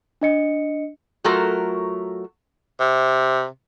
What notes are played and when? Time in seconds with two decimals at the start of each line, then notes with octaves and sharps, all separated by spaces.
0.21 D4 D#5 C#7
1.24 F#3 A3 F4 F#4 A4 A#4
2.80 C3